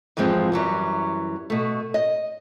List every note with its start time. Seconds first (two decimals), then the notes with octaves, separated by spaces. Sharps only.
0.17 F2 G#2 E3 F3 G#3 C4
0.52 F#2 E3 F#3 G3
1.50 B2 A3
1.94 D#5